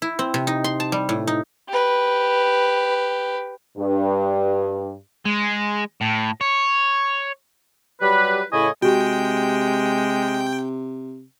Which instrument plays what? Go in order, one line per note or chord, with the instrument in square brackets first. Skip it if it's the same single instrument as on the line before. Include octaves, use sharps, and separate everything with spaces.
[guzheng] E4
C4
C3
D#4
C6
A5
G3
A2
D#4
[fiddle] G4 B4
[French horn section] G2
[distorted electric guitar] G#3
A2
C#5
[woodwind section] F#3 G3 G4 B4
A2 C#3 E4 D#5 G#5 C#6
[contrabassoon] C3 [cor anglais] G#3 [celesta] F#4 G4 [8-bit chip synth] G5